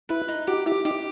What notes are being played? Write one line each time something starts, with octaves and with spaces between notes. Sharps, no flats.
E4 B4
D#4
F#4 G4
E4 G4
D#4 G4